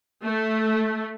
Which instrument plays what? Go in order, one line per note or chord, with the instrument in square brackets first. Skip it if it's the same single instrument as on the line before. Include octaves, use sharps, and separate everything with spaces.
[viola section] A3